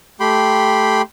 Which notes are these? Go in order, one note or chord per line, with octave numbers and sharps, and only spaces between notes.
A3 G4 G5 B5 C6